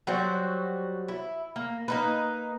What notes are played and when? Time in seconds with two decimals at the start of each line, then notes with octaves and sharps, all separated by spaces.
0.07 F#3 G3 F#4 C5
1.08 E4
1.56 A#3
1.88 A#3 D#4 B4